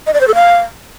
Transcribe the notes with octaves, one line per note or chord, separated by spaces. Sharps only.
D#5
D5
C5
A4
F5